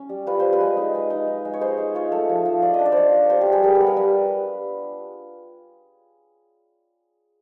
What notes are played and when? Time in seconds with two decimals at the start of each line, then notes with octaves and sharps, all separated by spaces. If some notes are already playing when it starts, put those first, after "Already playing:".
Already playing: C#4
0.09 G3
0.27 F4 B4
0.40 F4 C5
0.53 B4
0.60 G#3
0.77 D#4
0.95 G#3
1.10 D#4
1.27 D#4
1.45 G#3
1.53 C#5
1.61 G#3 C5
1.78 D#4
1.95 F4 C#5
2.12 A3
2.29 F3
2.45 F3
2.62 F4 D5
2.74 D#5
2.79 D4
2.85 D5
2.92 F4 C5 C#5
3.13 D4
3.30 G3 C5
3.41 G4
3.46 B3
3.52 G#4
3.63 G3 A#4
3.75 B4
3.81 B3
3.86 A#4
3.97 G3 B4